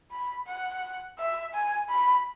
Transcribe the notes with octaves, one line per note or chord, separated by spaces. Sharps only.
B5
F#5
E5
G#5
B5